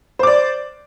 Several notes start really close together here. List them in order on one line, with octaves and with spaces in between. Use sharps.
C5 D6 D5